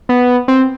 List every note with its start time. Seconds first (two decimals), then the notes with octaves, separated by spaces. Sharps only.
0.09 B3
0.48 C4